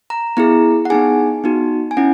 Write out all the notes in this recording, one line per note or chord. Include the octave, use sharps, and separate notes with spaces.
A#5
B3 E4 G#4 A#5
F#5
B3 D#4 G#4 G#5
B3 D#4 F#4
G#5
C#4 E4 F#5